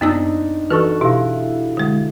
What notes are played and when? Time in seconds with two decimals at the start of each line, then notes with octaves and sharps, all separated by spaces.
0.01 F#2 B3 C4 D4 D#4 E6
0.70 E3 F#4 A4 B4 C#6 E6
1.01 B2 E4 G4 F5
1.77 D3 G#3